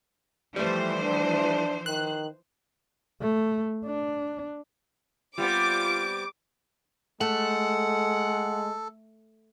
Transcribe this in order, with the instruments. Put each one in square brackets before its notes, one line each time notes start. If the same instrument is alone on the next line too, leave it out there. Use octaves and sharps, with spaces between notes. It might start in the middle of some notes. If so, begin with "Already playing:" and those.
[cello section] E3 F3 C5 [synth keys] G3 A3
[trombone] D4
[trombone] D#3 [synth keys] F#6
[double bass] A3
D4
[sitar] G3 B3 C4 [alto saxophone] F4 [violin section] D6
[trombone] G#3 [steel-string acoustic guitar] A3 [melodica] A4 [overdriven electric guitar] F#5